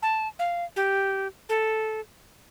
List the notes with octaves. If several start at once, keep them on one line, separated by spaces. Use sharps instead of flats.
A5
F5
G4
A4